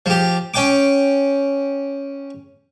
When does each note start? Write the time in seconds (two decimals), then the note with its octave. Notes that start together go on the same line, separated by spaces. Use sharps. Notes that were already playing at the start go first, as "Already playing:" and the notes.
0.06 F3 G4
0.54 C#4 G5 D6